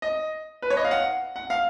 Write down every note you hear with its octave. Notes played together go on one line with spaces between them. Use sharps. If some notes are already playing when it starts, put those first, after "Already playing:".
D#5
B4
C#5
D#5
F5
F#5
F#5
F5